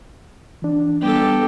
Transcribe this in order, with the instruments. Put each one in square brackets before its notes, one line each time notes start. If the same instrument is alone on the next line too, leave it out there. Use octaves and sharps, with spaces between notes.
[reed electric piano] E3 D4
[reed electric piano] G3 B3 D4 [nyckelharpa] G4 A4